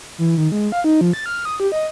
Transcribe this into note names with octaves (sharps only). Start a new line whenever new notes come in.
E3
D#3
G#3
F5
D#4
F3
A6
F6
D#6
G4
D#5